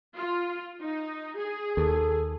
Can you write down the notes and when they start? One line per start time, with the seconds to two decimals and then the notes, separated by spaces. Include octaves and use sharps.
0.16 F4
0.81 D#4
1.37 G#4
1.77 D#2 A4